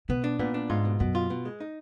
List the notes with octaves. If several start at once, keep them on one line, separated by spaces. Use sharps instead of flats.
B2 B3
D4
A#2 B3
D4
G#2 F4
B2
F#2 B2
F4
B2
G#3
D#4